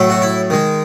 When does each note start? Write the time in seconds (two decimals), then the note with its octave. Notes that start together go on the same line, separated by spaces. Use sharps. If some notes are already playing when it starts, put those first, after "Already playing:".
Already playing: A2 F#3 A3
0.10 F#4
0.22 E4
0.50 D#3 G#3